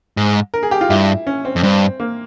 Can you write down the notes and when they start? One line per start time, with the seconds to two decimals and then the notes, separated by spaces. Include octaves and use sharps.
0.17 G#2
0.54 A#4
0.63 G#4
0.71 G4
0.81 F4
0.90 G2 E4
1.27 C#4
1.45 C4
1.56 F2
1.63 G2 C4
2.00 A#3